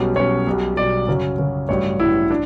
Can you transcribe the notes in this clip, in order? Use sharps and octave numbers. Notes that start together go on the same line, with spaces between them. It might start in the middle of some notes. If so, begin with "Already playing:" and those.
Already playing: B1 B2 G3 C#4
B1 B2 G3 C#4 C#5
B1 B2 G3
B1 B2 G3 D5
F#2 C#3 F#3 C#4
F#2 C#3 F#3 C#4
A1 G2 F#3 C#5
A1 G2 F#3 E4
D4